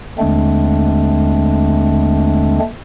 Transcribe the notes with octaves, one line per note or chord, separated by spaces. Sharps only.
D#2 D3 G#3 A3 C4 D4